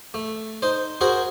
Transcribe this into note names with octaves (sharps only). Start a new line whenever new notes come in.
A3
D#4 C5
F#4 G#4 A#4 C5